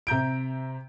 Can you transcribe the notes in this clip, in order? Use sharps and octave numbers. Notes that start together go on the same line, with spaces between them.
C3 A#5 G6 D7